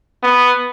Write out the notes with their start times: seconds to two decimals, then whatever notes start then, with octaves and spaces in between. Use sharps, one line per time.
0.23 B3